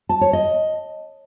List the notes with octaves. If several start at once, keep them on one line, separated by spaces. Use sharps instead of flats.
A5
C#5
D#5